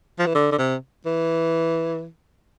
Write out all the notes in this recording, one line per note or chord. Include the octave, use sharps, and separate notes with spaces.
F3
E3
D3
D3
C3
E3